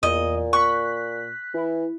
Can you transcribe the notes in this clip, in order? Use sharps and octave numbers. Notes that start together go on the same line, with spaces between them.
E2 A#2 D#5
C#6 F#6 B6
E3 E4